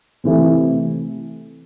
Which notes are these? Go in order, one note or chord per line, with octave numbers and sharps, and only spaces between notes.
C3 E3 A3 E4